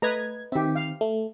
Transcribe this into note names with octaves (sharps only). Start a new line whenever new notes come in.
A3 B4 D#5 A#5 G#6
D#3 C4 G4 E5
F5
A3